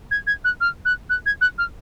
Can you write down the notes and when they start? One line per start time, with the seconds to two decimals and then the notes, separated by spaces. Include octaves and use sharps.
0.11 G#6
0.27 G#6
0.44 F#6
0.61 F6
0.85 F#6
1.10 F#6
1.26 G#6
1.41 F#6
1.58 F6